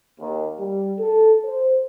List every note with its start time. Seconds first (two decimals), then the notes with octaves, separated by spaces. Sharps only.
0.20 D#2
0.60 G3
0.99 A4
1.45 C5